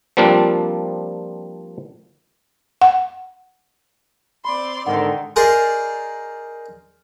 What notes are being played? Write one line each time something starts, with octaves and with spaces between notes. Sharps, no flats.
F3 G3 A#3 C4 D4 F4
F#5
C4 D5 B5 C6
G#2 D3 D#3 F#5
G#4 A#4 C5 D5 D#5